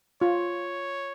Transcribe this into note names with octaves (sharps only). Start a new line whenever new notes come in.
F4 C#5